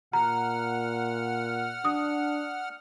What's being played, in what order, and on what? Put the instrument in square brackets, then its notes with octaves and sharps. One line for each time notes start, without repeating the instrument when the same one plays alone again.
[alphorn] A#2 [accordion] F#5 F6 [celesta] A#5
[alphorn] D4 [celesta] D#6